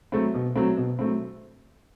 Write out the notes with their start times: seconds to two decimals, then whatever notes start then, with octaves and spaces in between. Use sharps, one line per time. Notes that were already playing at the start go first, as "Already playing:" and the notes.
0.12 F#3 A3 C4
0.34 B2
0.56 F#3 A3 C4
0.77 B2
0.99 F#3 A3 C4